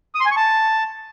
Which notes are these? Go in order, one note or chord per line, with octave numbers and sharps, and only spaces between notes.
D#6
C6
G#5
C#6
A5